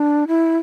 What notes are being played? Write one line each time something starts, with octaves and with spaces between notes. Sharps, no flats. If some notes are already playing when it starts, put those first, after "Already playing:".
Already playing: D4
E4